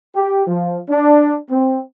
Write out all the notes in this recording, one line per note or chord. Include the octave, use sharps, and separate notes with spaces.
G4
F3
D4
C4